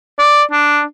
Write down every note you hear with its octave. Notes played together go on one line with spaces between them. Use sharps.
D5
D4